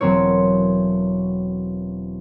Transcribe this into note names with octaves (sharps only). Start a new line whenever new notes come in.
E1 F#3 C4 A#4 C#5